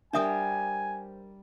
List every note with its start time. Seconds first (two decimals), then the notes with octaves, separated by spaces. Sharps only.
0.13 G3 D4 A#4 C5 E5 G#5 D#6